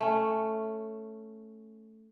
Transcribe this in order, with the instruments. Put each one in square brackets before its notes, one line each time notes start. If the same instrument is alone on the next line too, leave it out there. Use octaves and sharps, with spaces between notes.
[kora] A3 C#4